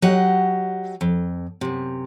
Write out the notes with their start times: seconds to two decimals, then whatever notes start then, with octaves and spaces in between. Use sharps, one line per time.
0.02 F#3 G4 D#5 F#5
1.01 F2
1.61 F#2 C3